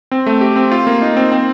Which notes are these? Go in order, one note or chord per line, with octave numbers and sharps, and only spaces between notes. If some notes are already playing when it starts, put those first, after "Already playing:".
C4
A3
G4
C4
F4
A#3
D#4
C4
C4